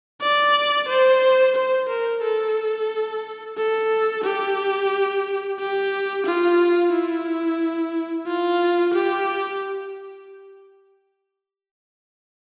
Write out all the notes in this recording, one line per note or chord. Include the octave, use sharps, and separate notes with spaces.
D5
C5
C5
A#4
A4
A4
G4
G4
F4
E4
F4
G4